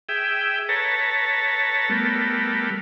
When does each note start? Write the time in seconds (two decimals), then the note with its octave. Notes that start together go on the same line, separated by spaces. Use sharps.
0.09 G#4 E5 G5
0.69 A4 B4 C#5 A5 A#5
1.89 G3 A3 B3 A#4